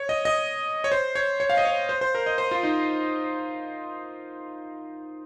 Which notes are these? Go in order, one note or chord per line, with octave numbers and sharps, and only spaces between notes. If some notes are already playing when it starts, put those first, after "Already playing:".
Already playing: C#5
D#5
D#5
C#5
C5
C#5
C#5
F5
D#5
C#5
C5
C5
A#4
D#5
C5
F4
D#4